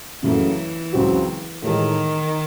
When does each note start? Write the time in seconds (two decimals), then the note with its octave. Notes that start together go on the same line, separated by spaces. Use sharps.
0.23 F#2 C#3 E3 F#3 A3
0.93 C#2 C#3 F#3 C4 F#4
1.62 A2 D#3 E3 G#3 D#4 A4